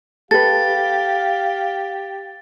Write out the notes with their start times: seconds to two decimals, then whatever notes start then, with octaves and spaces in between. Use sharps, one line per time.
0.31 G4 A4 B4 F5 A6